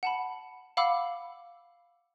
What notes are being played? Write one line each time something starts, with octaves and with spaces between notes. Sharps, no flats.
F#5 A5 B5
F5 F#5 B5 D6 E6